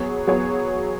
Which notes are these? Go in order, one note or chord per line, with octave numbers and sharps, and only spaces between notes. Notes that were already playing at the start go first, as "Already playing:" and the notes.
Already playing: F#3 B3 G#4 C#5
F#3 B3 G#4 C#5